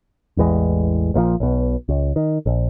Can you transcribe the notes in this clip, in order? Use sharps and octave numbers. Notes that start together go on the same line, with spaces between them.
A1 E2 E3 G#3
A#1 A#2 E3 F3
B1 B2
C#2
D#3
A#1